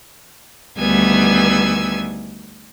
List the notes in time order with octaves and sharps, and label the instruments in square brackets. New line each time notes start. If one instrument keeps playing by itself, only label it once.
[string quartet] D2 D#3 G3 B3 G#5 E6